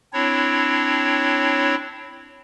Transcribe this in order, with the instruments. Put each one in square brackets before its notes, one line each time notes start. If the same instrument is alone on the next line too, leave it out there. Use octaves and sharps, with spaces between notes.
[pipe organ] C4 D4 E4 C#5